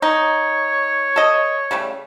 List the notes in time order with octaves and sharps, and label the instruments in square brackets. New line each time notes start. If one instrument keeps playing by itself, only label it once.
[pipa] D#4 [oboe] C#5
[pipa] A4 D#5
C#3 G3 A3